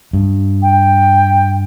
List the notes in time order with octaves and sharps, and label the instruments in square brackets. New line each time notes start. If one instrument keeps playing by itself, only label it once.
[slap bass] G2
[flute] G5